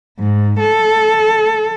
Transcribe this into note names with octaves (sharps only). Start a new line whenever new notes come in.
G#2
A4